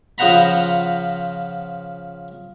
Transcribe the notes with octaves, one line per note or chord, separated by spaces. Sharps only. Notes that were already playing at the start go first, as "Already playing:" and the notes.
C#3 F3 C5 F#5 A#5 B5